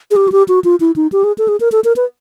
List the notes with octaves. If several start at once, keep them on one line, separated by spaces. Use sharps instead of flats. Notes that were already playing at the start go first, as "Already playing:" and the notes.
G#4
G4
F#4
G4
F#4
F4
E4
D#4
G4
G#4
A4
G#4
A#4
A4
A#4
B4